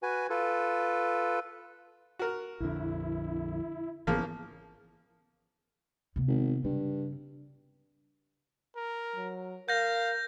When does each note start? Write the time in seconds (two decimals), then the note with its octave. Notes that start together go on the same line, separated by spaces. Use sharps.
0.03 F#4 B4 G#5
0.30 F4 A4 B4
2.19 F#4 A#4
2.60 A#1 F2 D3 E4
4.07 G#1 C#3 E3 F3 A#3 B3
6.16 C3 B3
6.28 G#1
6.64 G2 C#3
8.76 A#4
9.16 F#3
9.69 A#4 F5 G6 A#6